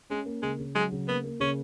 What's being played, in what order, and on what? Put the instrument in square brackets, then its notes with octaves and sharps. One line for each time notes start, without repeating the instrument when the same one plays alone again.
[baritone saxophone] G#3 [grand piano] C#4
[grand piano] A#3
[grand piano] C#3 [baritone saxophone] G#3
[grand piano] C#3
[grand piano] F#3 [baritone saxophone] G#3
[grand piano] C#3
[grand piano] A#3 [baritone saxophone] B3
[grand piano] A#3
[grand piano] C#3 [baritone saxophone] C#4